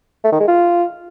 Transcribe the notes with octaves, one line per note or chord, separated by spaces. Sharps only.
A3
D#3
G#3
F4